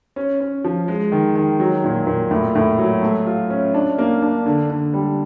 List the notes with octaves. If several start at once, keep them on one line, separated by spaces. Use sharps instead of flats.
C#4
C#4
F3
G#3
D#3
D#3
F#3
A#2
A#2
A2
A2
F#3
A3
F4
C#4
D4
A#3
D4
D3
D3
G3